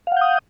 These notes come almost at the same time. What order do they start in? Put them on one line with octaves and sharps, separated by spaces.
F5 F#5 G6 D#6